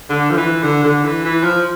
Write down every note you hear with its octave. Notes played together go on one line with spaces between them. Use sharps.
D3
F3
E3
D3
D3
E3
E3
F3